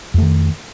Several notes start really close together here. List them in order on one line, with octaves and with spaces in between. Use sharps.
F2 A3 D#3